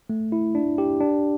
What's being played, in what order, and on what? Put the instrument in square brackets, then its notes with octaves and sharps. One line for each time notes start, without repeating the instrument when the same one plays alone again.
[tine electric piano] A3
E4
D4
G4
D4